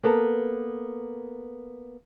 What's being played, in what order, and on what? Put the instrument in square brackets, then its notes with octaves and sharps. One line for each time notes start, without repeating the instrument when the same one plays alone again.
[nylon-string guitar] A#3 B3 A4 A#4